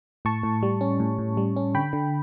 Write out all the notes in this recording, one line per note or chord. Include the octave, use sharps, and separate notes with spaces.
A2 A5 C#6
A2
G3
C#4
A2
A2
G3
C#4
D3 G5 B5
D3